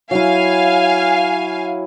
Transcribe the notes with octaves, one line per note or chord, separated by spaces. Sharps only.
F#3 E4 F5 G#5